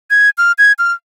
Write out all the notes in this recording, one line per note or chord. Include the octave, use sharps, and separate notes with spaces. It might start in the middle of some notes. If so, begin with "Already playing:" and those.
G#6
F6
G#6
F6